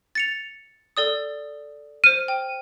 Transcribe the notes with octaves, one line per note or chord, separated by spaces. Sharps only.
A6 C#7 F7
A4 D5 D#6
C5 F6 D#7
G5